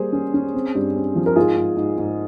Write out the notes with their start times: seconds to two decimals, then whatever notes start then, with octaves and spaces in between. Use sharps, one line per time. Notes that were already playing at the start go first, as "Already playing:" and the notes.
Already playing: G3 A#3 G#4 C5
0.13 C#4
0.34 C#4
0.54 C4
0.75 G2
0.96 C4
1.15 F3
1.26 A#4
1.36 G#2 F4 G#4
1.57 G#2
1.77 G#2
1.98 G#2